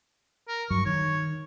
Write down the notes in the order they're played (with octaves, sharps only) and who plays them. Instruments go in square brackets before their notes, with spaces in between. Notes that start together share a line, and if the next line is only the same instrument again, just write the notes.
[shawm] A#4
[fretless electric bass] G2 F#3 [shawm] C#6
[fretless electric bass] D#3 [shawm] C#5